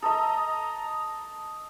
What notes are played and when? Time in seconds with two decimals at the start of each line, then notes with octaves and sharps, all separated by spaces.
0.03 A4 D#5 A#5 D#6